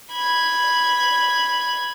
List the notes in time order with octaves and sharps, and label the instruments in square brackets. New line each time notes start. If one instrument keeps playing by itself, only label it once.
[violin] B5 G#6